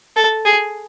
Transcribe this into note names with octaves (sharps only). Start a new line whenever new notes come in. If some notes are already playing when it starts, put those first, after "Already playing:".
A4
G#4